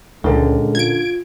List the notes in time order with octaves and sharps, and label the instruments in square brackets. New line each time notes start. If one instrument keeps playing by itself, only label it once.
[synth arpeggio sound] C#2 [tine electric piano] A#2 C#4 A#4 [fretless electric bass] D3 [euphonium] G#3
[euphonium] F4 [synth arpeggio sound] G#6 D7